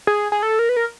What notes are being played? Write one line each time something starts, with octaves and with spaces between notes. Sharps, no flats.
G#4
G#4
A4
A#4
B4
A#4